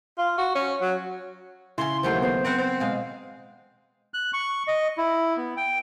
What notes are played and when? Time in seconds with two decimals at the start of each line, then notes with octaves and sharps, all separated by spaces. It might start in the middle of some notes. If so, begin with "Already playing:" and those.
0.18 F4
0.38 F#4
0.55 C#4
0.81 F#3
1.78 C#3 C#4 E4 C6
2.03 D#2 E3 F#3 A3 C5
2.22 B3 C5
2.44 C4 A#4 B4 F#5
2.58 C4
2.80 B2 G#3 F5
4.14 F#6
4.33 C#6
4.68 D#5
4.98 E4
5.37 B3
5.57 G5